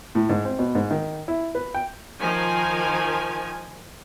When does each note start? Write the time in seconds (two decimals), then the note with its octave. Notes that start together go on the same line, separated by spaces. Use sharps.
0.15 A2
0.29 G#2
0.45 C4
0.59 B2
0.75 G#2
0.91 D#3
1.28 E4
1.55 B4
1.74 G5
2.20 D#3 F3 G#5